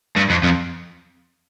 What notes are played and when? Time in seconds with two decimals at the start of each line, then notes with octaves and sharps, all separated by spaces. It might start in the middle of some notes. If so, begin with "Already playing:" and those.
0.17 G2
0.30 F2
0.43 F2